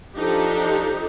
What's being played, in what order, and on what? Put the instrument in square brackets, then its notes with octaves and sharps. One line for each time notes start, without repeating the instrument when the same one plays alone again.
[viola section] F3 D4 D#4 G4 A4